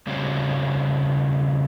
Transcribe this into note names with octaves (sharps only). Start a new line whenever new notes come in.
C#3 G3 C4 C#4 F#4 C5